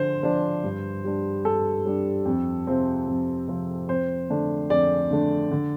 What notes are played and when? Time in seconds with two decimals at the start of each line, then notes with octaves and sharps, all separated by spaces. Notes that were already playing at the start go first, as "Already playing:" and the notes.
Already playing: D3 F3 D4 C5
0.23 F3 D4
0.64 G2
1.05 G3 D4
1.45 G2 A4
1.86 G3 D4
2.26 F2
2.67 C3 F3 C4
3.07 F2
3.47 C3 F3 C4
3.88 F2 C5
4.30 D3 A3 D4
4.70 F2 D5
5.11 D3 A3 D4
5.51 D3